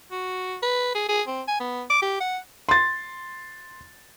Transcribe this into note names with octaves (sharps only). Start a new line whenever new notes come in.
F#4
B4
G#4
G#4
C4
G#5
B3
D6
G4
F#5
C6 A6